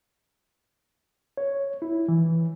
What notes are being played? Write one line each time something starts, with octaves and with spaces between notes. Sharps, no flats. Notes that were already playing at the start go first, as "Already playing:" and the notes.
C#5
E4
E3